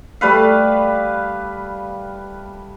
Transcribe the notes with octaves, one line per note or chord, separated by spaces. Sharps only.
G3 A3 B4 F5